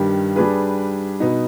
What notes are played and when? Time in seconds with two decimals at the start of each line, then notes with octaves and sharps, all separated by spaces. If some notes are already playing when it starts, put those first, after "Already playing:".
Already playing: G2 D#3 G3 D4
0.36 G3 D4 G#4 B4
1.20 B2 B3 D#4